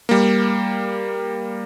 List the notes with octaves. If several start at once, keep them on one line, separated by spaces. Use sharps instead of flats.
G3 A#3